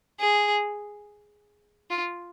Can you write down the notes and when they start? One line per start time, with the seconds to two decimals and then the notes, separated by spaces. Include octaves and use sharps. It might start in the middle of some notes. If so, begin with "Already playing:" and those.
0.20 G#4
1.90 F4